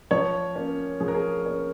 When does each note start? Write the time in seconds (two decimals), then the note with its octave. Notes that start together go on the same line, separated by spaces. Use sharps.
0.11 F3 C#5
0.56 A#3 C#4
1.00 F3 G#4
1.08 A#4
1.14 G#4
1.46 A#3 C#4